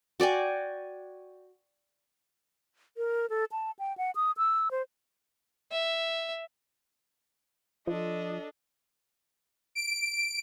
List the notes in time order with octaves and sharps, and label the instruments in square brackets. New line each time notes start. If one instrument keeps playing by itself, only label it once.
[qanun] F#4 D5 G5 G#5
[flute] A#4
A4
A5
G5
F#5
D#6
E6
C5
[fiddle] E5
[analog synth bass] F3 [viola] D4 A4 [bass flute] F4 [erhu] D#5
[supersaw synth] D7